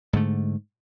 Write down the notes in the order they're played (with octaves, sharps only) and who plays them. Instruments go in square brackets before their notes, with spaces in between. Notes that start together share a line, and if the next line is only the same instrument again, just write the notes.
[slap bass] G#2 D3 A3